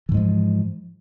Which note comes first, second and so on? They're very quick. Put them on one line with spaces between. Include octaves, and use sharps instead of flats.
E3 G#2 G#3 F3